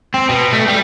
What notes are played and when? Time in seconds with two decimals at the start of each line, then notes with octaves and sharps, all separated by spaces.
0.14 C4
0.29 B2
0.53 A3
0.68 G3